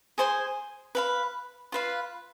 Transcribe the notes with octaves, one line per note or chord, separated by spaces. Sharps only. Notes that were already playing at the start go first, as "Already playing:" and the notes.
G#4 C5 G#5 C6
B4 F5 B5
F4 B4 F5